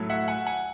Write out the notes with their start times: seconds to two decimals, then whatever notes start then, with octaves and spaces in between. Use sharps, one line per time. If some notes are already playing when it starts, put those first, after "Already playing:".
Already playing: A2 F#3 A3
0.10 E5 F#5
0.28 F#5 G#5
0.47 F#5 G#5